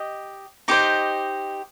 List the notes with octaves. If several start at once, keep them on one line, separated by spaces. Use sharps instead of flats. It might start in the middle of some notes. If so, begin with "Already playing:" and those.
Already playing: G4 D#5
D#4 G4 C5 D#5 D6